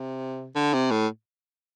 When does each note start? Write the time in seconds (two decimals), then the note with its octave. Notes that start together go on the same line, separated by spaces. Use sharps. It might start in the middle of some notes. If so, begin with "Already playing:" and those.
Already playing: C3
0.55 D3
0.73 C3
0.91 A2